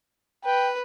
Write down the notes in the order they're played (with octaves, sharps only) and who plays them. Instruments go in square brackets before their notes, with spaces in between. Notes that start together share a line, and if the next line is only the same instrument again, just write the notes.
[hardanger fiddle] B4 [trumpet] G5